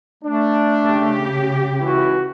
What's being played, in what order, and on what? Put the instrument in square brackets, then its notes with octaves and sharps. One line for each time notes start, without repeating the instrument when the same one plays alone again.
[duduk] A3 [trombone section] D4
[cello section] C#3 G4
[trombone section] C#2 E3 E4 [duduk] F#4